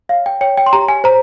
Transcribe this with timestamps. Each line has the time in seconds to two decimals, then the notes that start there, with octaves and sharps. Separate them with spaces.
0.09 C#5 F5
0.26 G5
0.41 C#5 G5
0.58 G5
0.66 C6
0.73 G4 A#5
0.89 G#5
1.04 C5 A#5